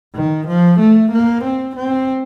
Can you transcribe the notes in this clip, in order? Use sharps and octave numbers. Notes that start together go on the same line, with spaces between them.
D#3
F3
A3
A#3
C4
C4